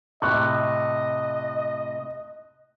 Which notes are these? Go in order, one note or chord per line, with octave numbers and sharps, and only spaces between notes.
A2 C3 D#5 C#6 F#6